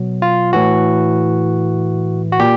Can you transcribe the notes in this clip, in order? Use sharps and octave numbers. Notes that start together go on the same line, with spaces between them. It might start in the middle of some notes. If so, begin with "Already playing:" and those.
Already playing: B2 F#3
F4
A2 E3 F#4
F#4
A#2 G4